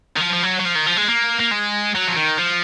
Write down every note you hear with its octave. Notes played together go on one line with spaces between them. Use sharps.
D#3
F3
F3
F#3
F#3
F3
D#3
F3
G#3
A#3
A#3
G#3
F#3
F3
D#3
F3